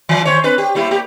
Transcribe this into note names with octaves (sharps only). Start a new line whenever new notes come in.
E3
D#2 C5 C#5
C4 D4 B4
G4
G3 A#3 E4
A#3 G4